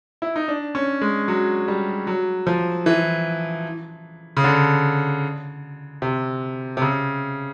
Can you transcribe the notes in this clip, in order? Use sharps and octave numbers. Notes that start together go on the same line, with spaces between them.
E4
D#4
D4
C#4
G#3
F#3
G3
F#3
F3
E3
C#3
D3
C3
C3
C#3